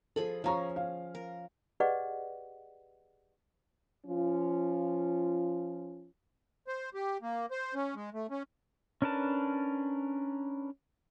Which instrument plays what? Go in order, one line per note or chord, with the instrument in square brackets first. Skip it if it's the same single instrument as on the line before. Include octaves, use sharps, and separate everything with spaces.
[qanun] F3 G#4 B5 [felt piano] A4
[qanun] F3 C#4 [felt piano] F5 A#5 C#6
[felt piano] F5
[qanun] A#4
[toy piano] G4 G#4 B4 D5 D#5 F#5
[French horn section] F3 C#4 F4
[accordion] C5
G4
A#3
C5
C#4
G#3
A3
C#4
[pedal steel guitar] C#4 D4 A#4 B4 A5